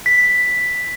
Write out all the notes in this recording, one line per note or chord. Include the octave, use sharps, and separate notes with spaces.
B6